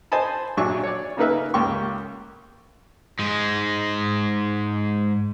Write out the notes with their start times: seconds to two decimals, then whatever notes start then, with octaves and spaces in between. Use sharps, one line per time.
0.12 C5 D#5 G#5 A5 B5
0.57 A#1 F#3 D4 E5 G#5 C#6
0.83 C#5 D5
1.17 C#3 A#3 D#4 A#4 B4 E5
1.54 C#2 A#3 G4 G5 C6 C#6
3.19 G#2 G#3